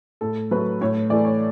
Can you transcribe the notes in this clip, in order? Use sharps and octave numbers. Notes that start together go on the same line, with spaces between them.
A2 A4
F#3 A3 B4
A2 C#5
E3 A3 D5
C#5